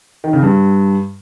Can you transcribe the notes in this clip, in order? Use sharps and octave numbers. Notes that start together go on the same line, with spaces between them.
D#3
C#3
G2